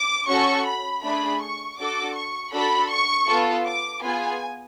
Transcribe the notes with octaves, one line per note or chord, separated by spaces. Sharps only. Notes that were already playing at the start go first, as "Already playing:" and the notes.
Already playing: D6
C#4 F#4 A4 C#6
B5
A3 D4 G#4 B5
C#6
D4 F#4 A4 D6
C#6
D4 F#4 A4 B5
C#6
B3 F4 A4
D6
B3 F4 G#4 G#5